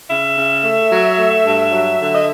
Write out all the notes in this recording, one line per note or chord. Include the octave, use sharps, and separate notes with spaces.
C#3 E5
C#3
A3
F#3
A3
G2
F#3
D3
D#5